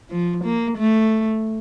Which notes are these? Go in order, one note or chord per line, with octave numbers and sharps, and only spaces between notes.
F3
A#3
A3